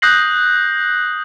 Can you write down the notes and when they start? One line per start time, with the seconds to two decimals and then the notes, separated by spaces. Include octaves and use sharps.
0.02 D#6 F#6 G6 A#6 C7 F#7